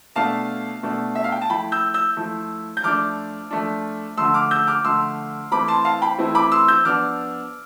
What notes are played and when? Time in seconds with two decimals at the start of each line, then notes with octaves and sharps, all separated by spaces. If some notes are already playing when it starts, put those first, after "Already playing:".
0.16 B2 A3 D4 F5 A5
0.83 B2 A3 D4
1.15 E5
1.24 F5
1.32 G5
1.41 A5
1.50 F3 A3 E4 G5 B5
1.72 E6 G6
1.94 E6 G6
2.17 F3 A3 E4
2.77 G6
2.83 F3 A3 D4 D6 F6
3.50 F3 A3 D4
4.17 D3 F3 A3 C6 E6
4.34 D6 F6
4.51 E6 G6
4.67 D6 F6
4.84 D3 F3 A3 C6 E6
5.51 E3 A3 C4 E4 B5 D6
5.68 A5 C6
5.85 F5 A5
6.02 G5 B5
6.18 E3 A3 C4 E4
6.35 B5 D6
6.52 C6 E6
6.68 E6 G6
6.85 F3 B3 D4 D6 F6